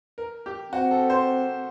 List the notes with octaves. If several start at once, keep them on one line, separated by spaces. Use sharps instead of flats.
A#4
G4
C4 F#4
A4
C5